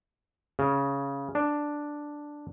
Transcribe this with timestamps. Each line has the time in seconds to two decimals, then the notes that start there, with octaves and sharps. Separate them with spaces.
0.59 C#3
1.35 D4